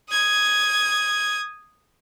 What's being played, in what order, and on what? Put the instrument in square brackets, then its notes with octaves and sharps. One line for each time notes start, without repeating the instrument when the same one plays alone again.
[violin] D#6 G#6